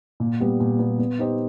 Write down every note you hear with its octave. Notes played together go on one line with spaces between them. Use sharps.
A#2
G3 B3
A#2
G3 B3
B3
D#4 G4 C5 D#5